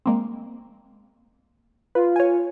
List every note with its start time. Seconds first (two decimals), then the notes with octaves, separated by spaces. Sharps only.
0.06 G#3 A#3 C4
1.95 F4 B4
2.16 C#5 G#5